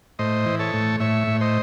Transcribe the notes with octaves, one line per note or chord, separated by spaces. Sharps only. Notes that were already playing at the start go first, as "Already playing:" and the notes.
A2 C5 D#5
E3
A4 C#5
A2
A2 C#5 E5
A2
C5 D#5